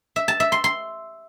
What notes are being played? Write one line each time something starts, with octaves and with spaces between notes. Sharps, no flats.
E5
A5
E5
C6
C6